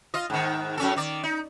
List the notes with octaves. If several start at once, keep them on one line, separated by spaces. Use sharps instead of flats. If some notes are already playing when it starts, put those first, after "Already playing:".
F4 D#5
G#2 D#3
F#2 C#4 A4
D#3 D5
D#4